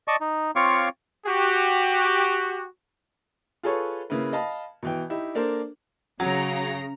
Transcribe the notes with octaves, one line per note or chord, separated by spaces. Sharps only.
D5 D#5 A5 C#6
D#4
C4 F4 C#5 F5 C#6 D6
F#4 G4
F4 G#4 A4 B4 C#5
C#3 A#3 E4 B4
D#5 F5 A5 B5
B2 E3 G5
D#4 E4 G4
A#3 D4 A4 A#4 C5
C#3 F#3 A#5